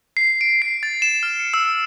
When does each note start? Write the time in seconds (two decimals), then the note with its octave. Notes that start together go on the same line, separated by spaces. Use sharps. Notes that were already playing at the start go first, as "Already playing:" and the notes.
0.17 C7
0.41 D7
0.62 C7
0.83 A6
1.02 E7
1.23 F6
1.40 C#7
1.54 E6